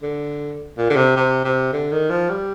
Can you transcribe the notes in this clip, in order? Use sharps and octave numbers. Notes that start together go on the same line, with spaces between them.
D3
A#2
D3
C3
C3
C3
D3
D#3
F3
G3